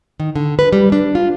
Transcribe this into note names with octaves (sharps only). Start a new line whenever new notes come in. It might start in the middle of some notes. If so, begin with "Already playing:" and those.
D#3
D3
B4
G3
D4
F4